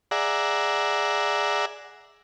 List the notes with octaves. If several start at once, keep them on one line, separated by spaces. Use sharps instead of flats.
G#4 D5 E5 F#5 A#5